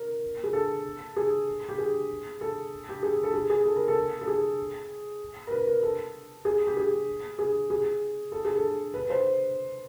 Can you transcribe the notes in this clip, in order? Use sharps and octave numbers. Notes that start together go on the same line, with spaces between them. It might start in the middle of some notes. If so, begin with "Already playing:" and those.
Already playing: A#4
G#4
A4
G#4
G4
G#4
A4
G4
G#4
A4
G#4
G#4
A4
A#4
A4
A4
G#4
A#4
B4
A#4
A4
G#4
G4
G#4
G#4
G#4
A4
G#4
A4
B4
C5